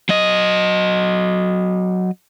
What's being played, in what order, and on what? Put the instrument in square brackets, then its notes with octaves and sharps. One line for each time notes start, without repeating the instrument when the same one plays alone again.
[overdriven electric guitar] F#3 D#5